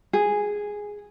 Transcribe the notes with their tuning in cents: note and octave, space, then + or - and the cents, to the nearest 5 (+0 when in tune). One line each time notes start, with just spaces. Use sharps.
G#4 -5